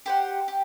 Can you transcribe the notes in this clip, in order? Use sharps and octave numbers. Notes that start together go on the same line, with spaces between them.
G4 C5 F#5
G4